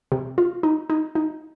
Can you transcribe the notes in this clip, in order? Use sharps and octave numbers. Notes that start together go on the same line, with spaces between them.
C3
F4
D#4
D#4
D#4